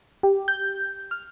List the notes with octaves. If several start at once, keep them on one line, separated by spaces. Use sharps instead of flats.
G4
G6
F6